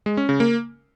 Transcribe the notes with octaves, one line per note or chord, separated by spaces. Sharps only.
G#3
C#4
C#3
A#3